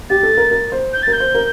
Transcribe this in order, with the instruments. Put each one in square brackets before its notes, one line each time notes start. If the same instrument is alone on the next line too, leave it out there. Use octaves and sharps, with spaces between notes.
[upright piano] G4 [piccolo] A6
[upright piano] A4
A#4
A#4
C5
[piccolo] G6
A6
[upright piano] A#4
[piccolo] G6
[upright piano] C5
A#4